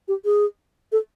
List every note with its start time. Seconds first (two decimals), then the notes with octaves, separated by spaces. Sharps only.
0.08 G4
0.25 G#4
0.92 A4